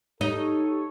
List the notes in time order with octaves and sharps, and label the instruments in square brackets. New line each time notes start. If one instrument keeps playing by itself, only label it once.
[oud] D#4 [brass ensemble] G4 A4 C#5